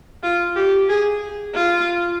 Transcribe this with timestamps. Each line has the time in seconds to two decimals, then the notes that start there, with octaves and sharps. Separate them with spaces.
0.23 F4
0.56 G4
0.89 G#4
1.54 F4